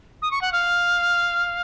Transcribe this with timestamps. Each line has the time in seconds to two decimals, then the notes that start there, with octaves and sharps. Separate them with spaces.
0.22 D#6
0.31 C#6
0.42 F#5
0.52 F5